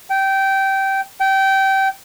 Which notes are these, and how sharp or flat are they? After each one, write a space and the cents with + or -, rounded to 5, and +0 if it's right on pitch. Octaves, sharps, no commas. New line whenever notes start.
G5 -15
G5 -20